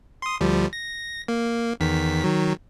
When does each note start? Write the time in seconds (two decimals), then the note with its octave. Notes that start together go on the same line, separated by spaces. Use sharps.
0.22 C6 D#6
0.41 D2 F3 G3
0.73 A#6
1.28 A#3
1.80 E2 D#3 B6
2.24 D#3 F#3